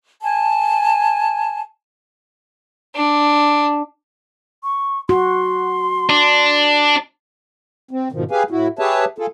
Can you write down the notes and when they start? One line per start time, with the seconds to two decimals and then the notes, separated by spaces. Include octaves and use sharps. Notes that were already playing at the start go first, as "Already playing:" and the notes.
0.22 G#5 A5
2.95 D4
4.63 C#6
5.09 F#4 C6
6.10 D4
7.91 C4
8.12 G#2 B2 D#3 F3
8.31 G4 G#4 B4 F5 G#5
8.51 A2 E4 F#4
8.79 G4 G#4 B4 C#5 E5 A5
9.18 F4 G#4 A4